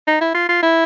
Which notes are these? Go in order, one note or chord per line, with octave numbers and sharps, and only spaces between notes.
D#4
E4
F4
F4
E4